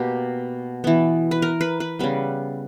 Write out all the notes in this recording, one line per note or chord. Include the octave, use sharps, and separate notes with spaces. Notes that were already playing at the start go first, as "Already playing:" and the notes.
Already playing: B2 A#3 G4
E3 B3
B4
A#4
B4
B4
C#3 G3 B3 B4